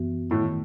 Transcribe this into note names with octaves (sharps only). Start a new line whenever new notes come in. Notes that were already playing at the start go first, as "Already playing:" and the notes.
Already playing: F#2 E3 B3 F#4
A2 D#3 A3 E4